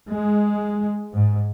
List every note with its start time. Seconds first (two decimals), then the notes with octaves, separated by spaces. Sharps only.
0.10 G#3
1.14 G#2